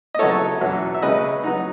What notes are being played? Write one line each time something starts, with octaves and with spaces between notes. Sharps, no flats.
D#5
C#3 F#3 B3 E4 A4 C#5
E2 B2 F#3 C#4 E4
E5
C#3 G#3 C#4 B4 D#5
F#3 B3 D#4